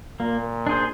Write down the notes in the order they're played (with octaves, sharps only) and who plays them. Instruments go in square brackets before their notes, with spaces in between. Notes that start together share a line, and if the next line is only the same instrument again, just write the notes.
[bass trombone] A#2 [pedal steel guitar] A#3
[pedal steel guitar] D4 G#4 C5